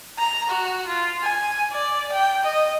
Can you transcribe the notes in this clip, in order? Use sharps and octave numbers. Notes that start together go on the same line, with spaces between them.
A#5
F#4
F4
G#5
D5
G5
D#5